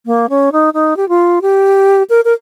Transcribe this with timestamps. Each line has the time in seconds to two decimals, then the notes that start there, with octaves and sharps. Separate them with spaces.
0.06 A#3
0.30 C#4
0.52 D#4
0.74 D#4
0.97 G4
1.09 F4
1.42 G4
2.10 A#4
2.25 A#4